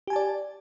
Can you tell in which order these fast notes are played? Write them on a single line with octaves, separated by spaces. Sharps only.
G4 G#5 A5 D5